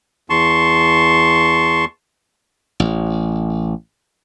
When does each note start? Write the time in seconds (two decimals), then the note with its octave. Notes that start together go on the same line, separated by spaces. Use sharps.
0.30 E2 A5 C6 C#6
2.80 A1